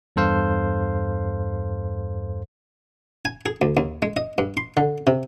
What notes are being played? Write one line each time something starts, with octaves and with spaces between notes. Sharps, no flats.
E2 G2 A4 C5 F5
G#5
G#4
D2
D#2
G#3
D#5
G2
C6
D3
C3